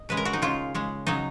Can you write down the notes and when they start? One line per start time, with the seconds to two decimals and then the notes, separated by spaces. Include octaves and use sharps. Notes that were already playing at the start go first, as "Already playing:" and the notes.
Already playing: D#5
0.09 C#3 G#3 B4
0.17 A#4
0.25 F#4
0.33 D#4
0.42 C#3 G#3 F4
0.75 C#3 G#3
1.07 C#3 F#3 D#4